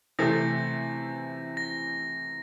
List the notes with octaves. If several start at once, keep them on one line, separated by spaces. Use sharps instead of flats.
C3 E3 A3 C4 A#6
A#6